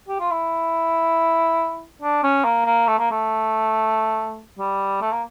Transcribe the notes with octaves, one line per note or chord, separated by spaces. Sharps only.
G4
F4
E4
D4
C#4
A#3
A#3
A3
A#3
A3
G3
A3
A#3